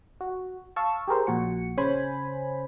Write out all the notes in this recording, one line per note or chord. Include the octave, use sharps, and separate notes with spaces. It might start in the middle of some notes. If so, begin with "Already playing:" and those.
F#4
F5 A5 C#6 E6
G4 G#4 A#4 C5
A#1 A#2 F#4 C#7
C#3 C#4 C5 G#5 B5